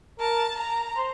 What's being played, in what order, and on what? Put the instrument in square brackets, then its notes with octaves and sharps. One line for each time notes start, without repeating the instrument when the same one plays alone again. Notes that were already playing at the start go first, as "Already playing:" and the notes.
[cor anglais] A#4 [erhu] A5
[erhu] A#5
[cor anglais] C5